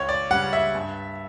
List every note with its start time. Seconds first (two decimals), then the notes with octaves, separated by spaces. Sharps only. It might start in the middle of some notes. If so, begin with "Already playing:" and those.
Already playing: C#2 C#5
0.09 D5
0.31 C#3 G3 F#5
0.53 E5
0.75 G2